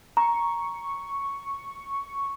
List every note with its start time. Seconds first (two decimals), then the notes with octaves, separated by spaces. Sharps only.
0.17 A#5 C#6